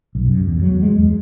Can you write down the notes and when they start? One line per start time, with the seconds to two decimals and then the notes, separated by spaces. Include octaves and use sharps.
0.15 B1
0.27 F#2
0.47 E2
0.62 F#3
0.82 G#3
0.98 E2